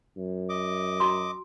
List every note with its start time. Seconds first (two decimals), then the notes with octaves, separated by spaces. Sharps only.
0.17 F#2
0.49 D#5 D6
1.00 F#4 A#5 C6